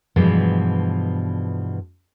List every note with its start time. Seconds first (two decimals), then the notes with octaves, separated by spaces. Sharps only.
0.16 G2 B2 E3 F3 G#3 B3